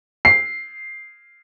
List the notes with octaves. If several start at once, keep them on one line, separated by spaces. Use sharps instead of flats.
C7